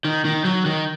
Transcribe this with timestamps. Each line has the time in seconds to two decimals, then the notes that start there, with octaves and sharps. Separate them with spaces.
0.05 D#3
0.25 D#3
0.45 F#3
0.65 D#3